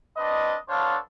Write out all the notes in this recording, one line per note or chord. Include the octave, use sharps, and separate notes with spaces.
C4 D4 B4 D#5
B3 D4 A4 C5 C#5 F5